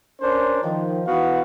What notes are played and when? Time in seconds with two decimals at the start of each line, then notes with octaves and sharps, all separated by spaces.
0.20 C#4 D4 A#4 C5
0.62 D#3 F3
1.06 E3 B3 F#4 F5